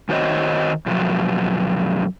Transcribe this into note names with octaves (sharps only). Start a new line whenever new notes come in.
D#3 F#4 C5 C#5 D#5
F#2 B2 F3 F#3